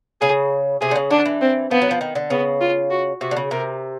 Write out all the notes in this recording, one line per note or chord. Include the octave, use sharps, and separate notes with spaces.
C#3 G#4
C3 G#4
D3
C#3
D3 D4
E3
C4
F3 B3
F#3
F3
D#3
D3
C#3 B3
F4
F#4
C3 F#4
D3
C#3
C3 A#4